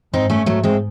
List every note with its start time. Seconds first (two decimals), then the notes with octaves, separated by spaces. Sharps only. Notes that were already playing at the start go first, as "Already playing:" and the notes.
0.13 G#2 C4 D#4
0.30 A3 C#4
0.46 G#2 F#3 A3
0.63 G#3 C4